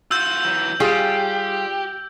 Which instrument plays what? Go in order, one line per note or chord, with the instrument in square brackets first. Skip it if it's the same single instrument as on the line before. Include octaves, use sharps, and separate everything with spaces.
[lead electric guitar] F4 F#4 [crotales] E6 G6
[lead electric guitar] E3 F#3
[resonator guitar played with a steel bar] G3 F4 G#4 [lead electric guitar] G4